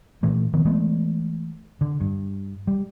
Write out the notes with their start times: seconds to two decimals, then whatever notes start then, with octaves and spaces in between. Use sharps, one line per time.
0.23 A#2 E3 A3
0.53 D#3 F3 B3
0.65 E3 G#3 A3 B3
1.81 D3
2.01 G2
2.67 G3